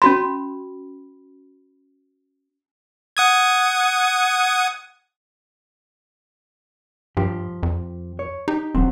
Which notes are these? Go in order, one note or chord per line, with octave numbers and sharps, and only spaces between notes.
C#4 F#4 B5 C6
F#5 D#6 G#6
G2 F3 G4
F2
C#5
D#4 G4
E1 F#3 C4